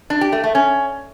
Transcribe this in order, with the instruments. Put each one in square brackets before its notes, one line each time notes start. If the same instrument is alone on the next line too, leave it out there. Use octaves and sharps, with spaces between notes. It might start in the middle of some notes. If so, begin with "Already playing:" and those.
[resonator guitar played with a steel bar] D4
G4
A3
A3
C#4